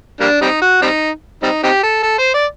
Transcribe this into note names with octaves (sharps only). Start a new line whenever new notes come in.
G3 A#3 D4
G3 C4 D#4
F#4
G3 C4 D#4
G3 C4 D#4
C4 D#4 G4
A4
A4
C5
D5